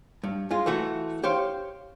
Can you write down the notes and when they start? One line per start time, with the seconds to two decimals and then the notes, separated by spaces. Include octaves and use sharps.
0.23 G2
0.51 G#3 F4
0.66 E3 A3 F#4
1.23 G4 C5 C#5 F5